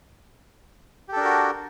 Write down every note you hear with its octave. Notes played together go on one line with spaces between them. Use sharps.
D4 F#4 G4 A4 A#4